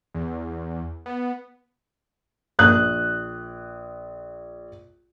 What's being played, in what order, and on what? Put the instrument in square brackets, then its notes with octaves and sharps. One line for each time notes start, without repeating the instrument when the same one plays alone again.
[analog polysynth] E2
B3
[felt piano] A#1 D#6 F#6